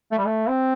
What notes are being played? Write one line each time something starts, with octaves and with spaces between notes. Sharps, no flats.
A3
G3
A3
C4